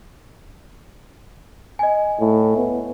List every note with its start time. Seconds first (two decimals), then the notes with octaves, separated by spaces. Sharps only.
1.79 D#5 G#5
2.20 A2
2.57 B3